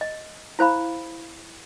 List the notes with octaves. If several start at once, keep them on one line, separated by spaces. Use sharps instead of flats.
D#5
E4 C5 F5 B5